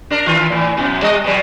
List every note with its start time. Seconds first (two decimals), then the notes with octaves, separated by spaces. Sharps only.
0.10 D4 A#4
0.26 D#3 F4
0.50 A2 E3
0.77 F#2 B2
1.02 G3 D#5
1.24 B2 F#3